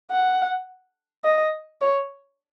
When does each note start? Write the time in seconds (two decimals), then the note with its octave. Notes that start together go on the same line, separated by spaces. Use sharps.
0.11 F#5
1.25 D#5
1.81 C#5